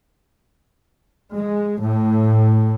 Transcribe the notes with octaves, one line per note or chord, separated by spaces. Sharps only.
G#3
A2